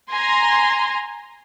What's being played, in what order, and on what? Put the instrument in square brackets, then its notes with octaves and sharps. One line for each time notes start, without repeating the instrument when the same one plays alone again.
[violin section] G#5 A#5 C6